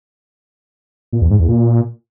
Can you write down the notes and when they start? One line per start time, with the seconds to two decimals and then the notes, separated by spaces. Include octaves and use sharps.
1.13 A#2
1.21 E2
1.30 G#2
1.39 E2
1.48 A#2